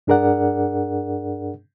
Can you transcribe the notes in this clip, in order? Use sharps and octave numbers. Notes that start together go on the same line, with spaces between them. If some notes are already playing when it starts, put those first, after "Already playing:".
G2 D4 G#4 A#4 D5 F#5